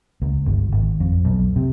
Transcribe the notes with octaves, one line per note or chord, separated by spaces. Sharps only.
C#2
G1
G#1
F2
B1
C3